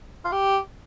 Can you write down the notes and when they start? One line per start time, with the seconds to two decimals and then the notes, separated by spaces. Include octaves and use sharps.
0.25 F4
0.32 G4